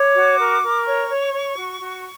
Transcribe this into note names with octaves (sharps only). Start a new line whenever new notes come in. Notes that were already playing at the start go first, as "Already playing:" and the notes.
Already playing: C#5 D6
F#4
A#4
A#4
C#5 C#6
C#5
C#5
F#4
F#4